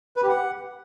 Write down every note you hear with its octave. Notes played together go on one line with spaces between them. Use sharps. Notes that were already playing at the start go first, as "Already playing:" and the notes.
B4
G4
F#5